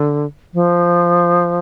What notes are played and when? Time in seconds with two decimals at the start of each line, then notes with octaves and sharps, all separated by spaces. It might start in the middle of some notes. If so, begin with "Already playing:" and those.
Already playing: D3
0.54 F3